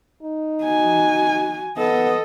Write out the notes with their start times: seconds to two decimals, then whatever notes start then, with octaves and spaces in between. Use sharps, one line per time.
0.23 D#4
0.63 F#4 G#5
1.78 B3 A4 D#5